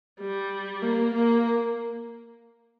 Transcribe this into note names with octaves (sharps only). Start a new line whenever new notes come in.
G3
A#3
A#3